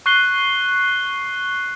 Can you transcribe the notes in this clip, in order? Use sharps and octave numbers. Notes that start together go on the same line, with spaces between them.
C#6 F#6 C7 G7